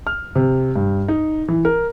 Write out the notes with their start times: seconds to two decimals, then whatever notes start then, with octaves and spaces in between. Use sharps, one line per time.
0.07 F6
0.35 C3
0.76 G2
1.08 D#4
1.48 E3
1.65 A#4